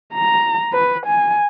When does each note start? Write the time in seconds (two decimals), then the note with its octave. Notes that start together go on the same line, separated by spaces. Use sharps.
0.14 A#5
0.73 B4
1.06 G#5